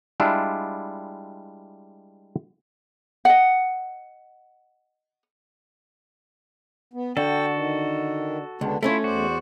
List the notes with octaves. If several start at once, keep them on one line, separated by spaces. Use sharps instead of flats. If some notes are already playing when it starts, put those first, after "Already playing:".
G3 G#3 D4 E4 F4
D#5 F#5
B3
D3 F#4 A4 G5
D#3
C#2 D3 B3 D4
A3 C#4 E4 F4 C#5
E2 F#4 C5 D5